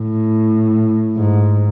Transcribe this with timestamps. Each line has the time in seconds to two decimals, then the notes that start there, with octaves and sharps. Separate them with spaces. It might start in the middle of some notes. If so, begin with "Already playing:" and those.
Already playing: A2
1.17 G#2